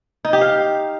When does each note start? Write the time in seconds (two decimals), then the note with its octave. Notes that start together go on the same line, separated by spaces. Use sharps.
0.25 D#4
0.33 G4
0.41 F5